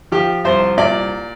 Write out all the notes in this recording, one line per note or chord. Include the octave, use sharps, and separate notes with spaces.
F3 G4
C2 C5
A#2 D5